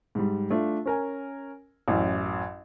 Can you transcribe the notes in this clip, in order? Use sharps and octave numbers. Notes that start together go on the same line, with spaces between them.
G#2 G3
A3 D4 F4
C#4 A#4 G#5
A1 F#2